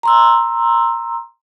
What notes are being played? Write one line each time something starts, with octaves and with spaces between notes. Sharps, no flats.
A#5 C6 E6